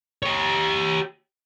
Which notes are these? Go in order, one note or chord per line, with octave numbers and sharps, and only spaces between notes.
G4 C#5